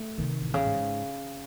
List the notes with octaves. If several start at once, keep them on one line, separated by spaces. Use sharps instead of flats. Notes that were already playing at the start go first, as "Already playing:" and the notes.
Already playing: A3
C3 D#3
A1
C#3
G#2